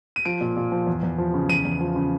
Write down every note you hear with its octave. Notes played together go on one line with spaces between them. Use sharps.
D#7
F3 D7
A#2
A#2
F3
E2
E2
F3
C#3
E2 D#7
E2
F3
C#3